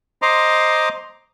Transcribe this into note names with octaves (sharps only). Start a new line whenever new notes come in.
C5 D#5 A#5 C6 D6